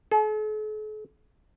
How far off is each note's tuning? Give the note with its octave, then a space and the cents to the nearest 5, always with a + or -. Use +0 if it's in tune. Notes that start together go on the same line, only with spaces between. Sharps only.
A4 -45